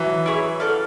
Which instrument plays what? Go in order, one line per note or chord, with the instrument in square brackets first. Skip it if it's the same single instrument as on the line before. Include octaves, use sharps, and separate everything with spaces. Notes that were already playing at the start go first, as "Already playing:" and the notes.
Already playing: [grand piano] E3 F#3
[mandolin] E4 G#4 C#5 E5
F#4 A4 D5 F5